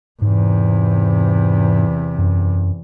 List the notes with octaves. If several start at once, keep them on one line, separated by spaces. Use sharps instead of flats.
E2 G#2 C3
F#2